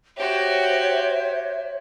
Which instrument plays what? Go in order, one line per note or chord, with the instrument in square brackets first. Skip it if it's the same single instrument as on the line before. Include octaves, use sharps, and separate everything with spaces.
[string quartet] F#4 G4 [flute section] C5 C#5 E5